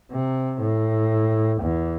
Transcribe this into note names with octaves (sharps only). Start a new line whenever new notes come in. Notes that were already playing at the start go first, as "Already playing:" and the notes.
C3
A2
E2